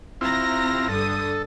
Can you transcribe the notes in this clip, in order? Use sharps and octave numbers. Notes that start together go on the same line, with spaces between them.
C3 C4 E4 F4 A#5 A#6
G2 D3 A4 D#6